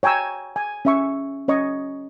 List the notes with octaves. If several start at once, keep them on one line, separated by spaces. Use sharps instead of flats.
C#5 G5 G#5 A#5 E6
G#5
C#4 E5 C#6
C#4 C#5 D#5 C#6